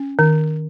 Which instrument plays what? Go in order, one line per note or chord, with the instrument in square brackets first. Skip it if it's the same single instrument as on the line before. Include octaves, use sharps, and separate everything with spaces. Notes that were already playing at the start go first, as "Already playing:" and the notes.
Already playing: [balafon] C#4
D#3